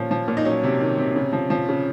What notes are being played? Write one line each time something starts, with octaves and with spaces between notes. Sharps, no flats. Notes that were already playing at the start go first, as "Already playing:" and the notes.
Already playing: A#2 F3 C#4
F3
A#2
D#4
F#3 C#4
C3
D#3
C3
C#3
F3
F3
C#3